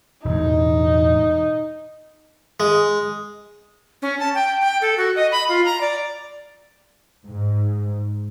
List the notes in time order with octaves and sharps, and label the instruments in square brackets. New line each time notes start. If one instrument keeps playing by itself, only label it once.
[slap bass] E1 A2 [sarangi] D#4
[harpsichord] G#3
[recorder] C#4
A5
G5
G5
A4
F#4
D#5
B5
F4
A#5
D5
[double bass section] G#2